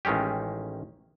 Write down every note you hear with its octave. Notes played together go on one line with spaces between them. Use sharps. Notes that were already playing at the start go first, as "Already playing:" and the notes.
A1 D#3 G#3 C#4 G4